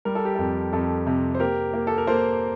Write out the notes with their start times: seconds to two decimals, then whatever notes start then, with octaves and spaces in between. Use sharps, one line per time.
0.05 G3 A#4
0.15 A4
0.25 G4
0.35 F2 A4
0.73 F2 A4
1.07 C3
1.35 C5
1.40 A#3 G4 A#4
1.74 A#3
1.87 A4
1.98 A#4
2.07 A#3 A4 C5